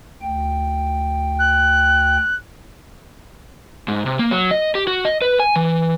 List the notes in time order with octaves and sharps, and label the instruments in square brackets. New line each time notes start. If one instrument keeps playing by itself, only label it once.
[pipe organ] D2 G5
[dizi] F#6
[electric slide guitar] G#2
C3
A#3
F#3
D#5
G4
F#4
D#5
B4
G#5
E3